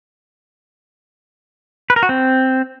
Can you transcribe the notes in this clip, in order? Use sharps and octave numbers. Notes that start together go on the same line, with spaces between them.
B4
A#4
F#4
C4